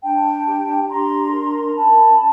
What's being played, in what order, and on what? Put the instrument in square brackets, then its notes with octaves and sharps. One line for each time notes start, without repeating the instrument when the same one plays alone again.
[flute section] D4 G5 A5
G4
D4 A#5 C6
A#4
A#5
C#4 A5 B5